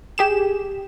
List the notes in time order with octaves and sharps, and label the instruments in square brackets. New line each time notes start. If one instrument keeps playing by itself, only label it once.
[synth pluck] G4 G#4 E7